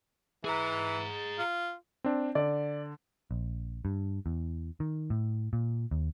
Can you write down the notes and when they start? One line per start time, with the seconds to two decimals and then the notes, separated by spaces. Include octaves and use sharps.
0.45 E3 G#4 A#5
1.38 F4
2.04 C4 D4
2.35 D3 D5
3.31 A#1
3.85 G2
4.26 E2
4.80 D#3
5.10 A2
5.53 A#2
5.91 D#2